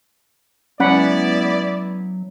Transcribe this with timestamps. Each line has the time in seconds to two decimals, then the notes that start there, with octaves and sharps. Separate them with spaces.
0.80 F#3 G#3 B3 C#4 E4 D5 F#5 B5